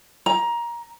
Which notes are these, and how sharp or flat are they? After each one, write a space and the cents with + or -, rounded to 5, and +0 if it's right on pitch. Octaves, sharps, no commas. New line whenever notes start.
A#5 +20